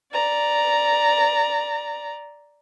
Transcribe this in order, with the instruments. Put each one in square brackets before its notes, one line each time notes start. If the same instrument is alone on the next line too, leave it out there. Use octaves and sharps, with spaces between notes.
[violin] D5 A#5